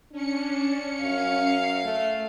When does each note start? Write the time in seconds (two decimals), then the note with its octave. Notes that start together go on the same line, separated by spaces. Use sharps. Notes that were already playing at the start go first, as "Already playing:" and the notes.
0.12 C#4 D4 C#7
1.01 F#2 F5
1.84 A3